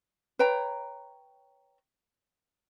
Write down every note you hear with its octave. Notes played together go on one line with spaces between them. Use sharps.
B4 C#5 G5 A#5